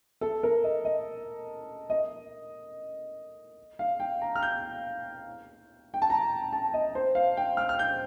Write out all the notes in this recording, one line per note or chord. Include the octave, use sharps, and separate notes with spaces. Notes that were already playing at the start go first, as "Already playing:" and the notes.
A4
A#4
D#5
D#5
D#5
F5
G5
A#5
F6
G6
G5
A5
A#5
A5
D#5
C5
F5
G5
F6
F6
G6